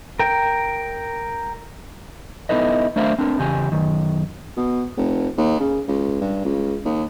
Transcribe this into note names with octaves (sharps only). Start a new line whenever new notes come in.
A#4 G5
B3 D#4 E4 A4 B4 D#5
A3 D4 A#4 C5 E5 F5
C4 D4 A#4
E2 C#3 G4 G#5
F#2 D#3
B2
F1
D#2
C#3
C#2
G2
C#2
D#2